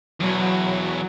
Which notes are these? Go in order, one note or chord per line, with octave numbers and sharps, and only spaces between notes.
E2 B2 F#3